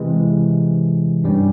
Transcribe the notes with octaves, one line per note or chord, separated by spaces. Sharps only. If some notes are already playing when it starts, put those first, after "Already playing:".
Already playing: C3 E3 G#3
G2 G3 C#4